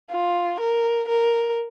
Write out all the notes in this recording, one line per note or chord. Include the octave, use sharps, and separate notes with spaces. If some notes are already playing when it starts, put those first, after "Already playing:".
F4
A#4
A#4